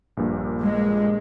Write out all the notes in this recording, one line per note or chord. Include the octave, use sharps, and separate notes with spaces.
A#1 G2 A#2
G#3